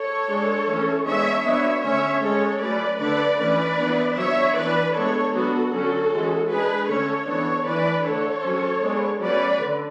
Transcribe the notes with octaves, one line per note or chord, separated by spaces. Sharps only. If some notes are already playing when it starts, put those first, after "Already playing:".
Already playing: A4 C#5
G#3 D4
E3 A3 C#4
G#3 B3 D4 C#5 E5
F#3 B3 D4 C#5 E5
D3 A3 C#4 C#5 E5
G#3 C#4 A4 C#5
F#3 A3 C#4 B4 D5
D3 A3 D4 B4 D5
E3 A3 C#4 B4 D5
E3 B3 D4
F#3 B3 D4 C#5 E5
E3 B3 D4 B4 D5
G#3 B3 D4 A4 C#5
F#3 B3 D4 F#4 A4
D3 F#3 C#4 F#4 A4
E3 G#3 C#4
G#3 D4 G#4 B4
D3 A3 C#4 A4 C#5
E3 B3 D4 A4 C#5
E3 A3 D4 B4 D5
D3 A3 D4 A4 C#5
F#3 C#4
G#3 B3 D4
F#3 A3 C#4 B4 D5
D3